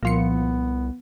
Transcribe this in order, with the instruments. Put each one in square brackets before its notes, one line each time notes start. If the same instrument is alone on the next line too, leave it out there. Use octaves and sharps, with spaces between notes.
[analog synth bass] C2 [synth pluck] A#2 F3 C#7 [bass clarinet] B3